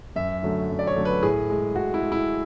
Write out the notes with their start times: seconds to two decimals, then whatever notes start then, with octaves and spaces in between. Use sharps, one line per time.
0.16 F#2 E5
0.43 D3 F#3 A3
0.69 F#2
0.79 D5
0.87 C#5
0.96 D3 F#3 A3
1.05 B4
1.23 A2 G#4
1.50 G#3
1.76 A2 F#4
1.94 E4
2.03 G#3
2.12 E4